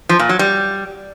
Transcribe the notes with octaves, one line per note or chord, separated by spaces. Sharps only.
F3
A#2
F#3
G3